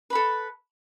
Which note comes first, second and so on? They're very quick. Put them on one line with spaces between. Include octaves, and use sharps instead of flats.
B4 B5 A4